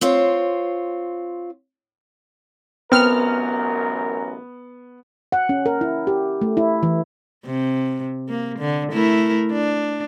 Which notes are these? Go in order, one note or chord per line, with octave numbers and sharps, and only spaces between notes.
C4 F4 C#5
A1 F#2 B3 C4 A#4 F6
F#5
C#4
A#4
E4
G4
A3
E4
E3
C3
A#3
D3
A3 E4 A#4
D4